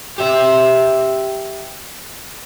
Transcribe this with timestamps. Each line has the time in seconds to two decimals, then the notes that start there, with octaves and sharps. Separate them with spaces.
0.18 G4 E5